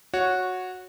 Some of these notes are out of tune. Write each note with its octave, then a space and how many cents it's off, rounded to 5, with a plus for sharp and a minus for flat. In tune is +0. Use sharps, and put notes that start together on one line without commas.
F#4 -10 C#5 +0